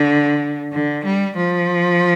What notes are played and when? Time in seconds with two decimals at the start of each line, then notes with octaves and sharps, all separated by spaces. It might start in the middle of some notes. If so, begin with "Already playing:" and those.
Already playing: D3
0.72 D3
1.05 G3
1.37 F3